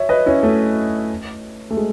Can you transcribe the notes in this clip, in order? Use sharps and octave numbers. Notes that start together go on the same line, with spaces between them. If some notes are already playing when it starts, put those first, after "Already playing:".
Already playing: C#5 E5
B4 D#5
C#4 E4
A3 C#4
A3
G#3